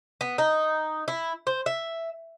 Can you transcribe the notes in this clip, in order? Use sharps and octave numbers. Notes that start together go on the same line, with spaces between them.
B3
D#4
E4
C5
E5